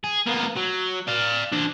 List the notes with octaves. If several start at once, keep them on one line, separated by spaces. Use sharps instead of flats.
G#4
A#3 B3
F#3
D5 F5
D4 C5